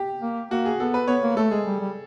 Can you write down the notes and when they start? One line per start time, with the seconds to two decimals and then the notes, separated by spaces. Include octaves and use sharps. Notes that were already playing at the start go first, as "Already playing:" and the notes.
Already playing: G4
0.21 A#3
0.51 A#3 F#4
0.66 G#4
0.80 B3 A4
0.94 B4
1.07 B3 C#5
1.23 A#3
1.36 A3 A4
1.51 G#3 G#4
1.66 G3
1.80 G3